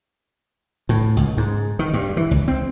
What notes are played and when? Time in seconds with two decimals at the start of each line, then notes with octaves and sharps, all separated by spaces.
0.89 A2
1.17 C#2
1.37 G#2
1.79 D#3
1.94 G2
2.17 E3
2.31 C#2
2.48 C4